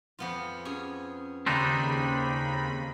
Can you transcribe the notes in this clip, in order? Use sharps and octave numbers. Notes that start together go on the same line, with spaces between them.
F2 B3 F4
C#4 G#4
D#2 C#3 C4 D4 D#4 C#5 B5